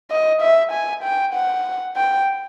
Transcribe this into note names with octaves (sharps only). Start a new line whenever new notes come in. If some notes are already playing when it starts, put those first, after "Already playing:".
D#5
E5
G#5
G5
F#5
G5